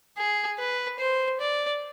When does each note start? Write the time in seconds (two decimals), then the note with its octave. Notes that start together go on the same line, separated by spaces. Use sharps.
0.17 G#4
0.59 B4
1.00 C5
1.40 D5